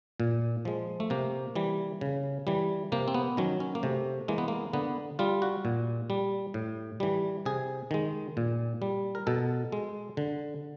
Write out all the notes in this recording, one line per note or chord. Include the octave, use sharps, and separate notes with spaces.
A#2
F3 G#3
A3
C3 A#3
E3 G3
C#3
E3 G3
C3 A#3
C4
B3
D#3 F#3 C#4
C#4
A#3
C3 A3
E3 G#3 A#3
B3
A#3
D3 B3
G3 F4
F#4
A#2
G3
A2
E3 G3
C3 G#4
D#3 G#3
A#2
G3
A#4
B2 A4
G#3
D3